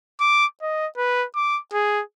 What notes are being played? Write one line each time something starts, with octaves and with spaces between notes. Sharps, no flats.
D6
D#5
B4
D6
G#4